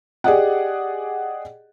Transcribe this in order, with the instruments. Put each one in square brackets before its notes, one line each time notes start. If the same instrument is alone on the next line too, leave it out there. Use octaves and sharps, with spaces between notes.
[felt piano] G4 G#4 D5 D#5 F#5